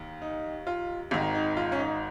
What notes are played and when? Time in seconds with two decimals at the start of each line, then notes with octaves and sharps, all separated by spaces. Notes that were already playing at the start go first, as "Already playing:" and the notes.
Already playing: D#2 D#3
0.22 D#4
0.67 F4
1.11 G#1 G#2 D#3
1.35 D#4
1.57 F4
1.72 C#4
1.79 D#4